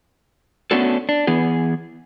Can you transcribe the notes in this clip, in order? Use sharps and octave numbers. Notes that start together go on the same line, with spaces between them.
A3 B3 C#4 D4 F#4 A4
D4
E3 B3 G#4